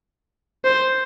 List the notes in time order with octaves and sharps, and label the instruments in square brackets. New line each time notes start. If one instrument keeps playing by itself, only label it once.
[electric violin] C5